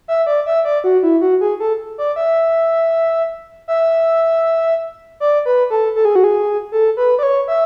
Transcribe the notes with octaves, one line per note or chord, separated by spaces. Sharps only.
E5
D5
E5
D5
F#4
E4
F#4
G#4
A4
D5
E5
E5
D5
B4
A4
A4
G#4
F#4
G#4
A4
B4
D5
C#5
E5